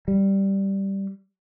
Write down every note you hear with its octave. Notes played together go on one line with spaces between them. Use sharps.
G3